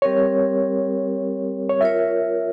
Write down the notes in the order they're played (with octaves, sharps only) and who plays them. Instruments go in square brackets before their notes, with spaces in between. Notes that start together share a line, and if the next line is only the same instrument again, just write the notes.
[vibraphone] G3 C4 G4 A#4 [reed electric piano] C#5
[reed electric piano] C#5
[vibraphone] F4 A#4 C#5 [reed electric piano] E5